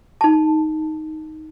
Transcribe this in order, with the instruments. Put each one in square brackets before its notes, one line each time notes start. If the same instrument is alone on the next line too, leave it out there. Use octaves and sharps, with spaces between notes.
[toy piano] D#4 A5